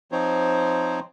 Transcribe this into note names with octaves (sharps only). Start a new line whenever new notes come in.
F3 C4 D#4 C5 C#5